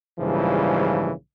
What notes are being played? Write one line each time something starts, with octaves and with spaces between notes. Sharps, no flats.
A#1 G#2 C#3 E3 F3 G3